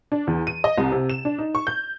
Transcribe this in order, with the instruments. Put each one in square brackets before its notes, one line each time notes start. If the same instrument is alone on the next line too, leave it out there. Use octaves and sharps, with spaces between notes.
[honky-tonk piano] D4
E2
D#7
D#5
C2
C3
E7
D4
D#4
C#6
G6